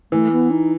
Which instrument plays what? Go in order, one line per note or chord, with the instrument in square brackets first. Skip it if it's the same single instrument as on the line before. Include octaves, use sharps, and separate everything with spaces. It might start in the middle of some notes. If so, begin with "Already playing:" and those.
[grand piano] E3 [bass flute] A3
[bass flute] B3
D#4